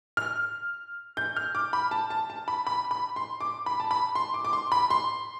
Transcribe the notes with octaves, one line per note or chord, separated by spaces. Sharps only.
F6
G6
F6
D6
B5
A5
A5
A5
B5
B5
B5
C6
D6
B5
A5
B5
C6
D6
D6
C6
B5
C6